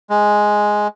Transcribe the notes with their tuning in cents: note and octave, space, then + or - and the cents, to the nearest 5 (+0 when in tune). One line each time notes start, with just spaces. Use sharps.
G#3 +5